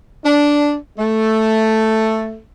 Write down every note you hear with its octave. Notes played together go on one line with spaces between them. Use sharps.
D4
A3